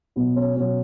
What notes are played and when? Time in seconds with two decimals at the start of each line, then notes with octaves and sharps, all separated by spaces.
0.16 B2 F#3 B3
0.36 C#4
0.56 B2 F#3 C#4